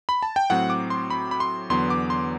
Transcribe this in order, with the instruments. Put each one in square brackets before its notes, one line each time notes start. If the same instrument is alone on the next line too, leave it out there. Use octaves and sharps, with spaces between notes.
[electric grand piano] B5
A5
G5
A2 F#3 C4 F#5
D6
C6
B5
B5
C6
E2 D3 F#3 B3 C6
D6
C6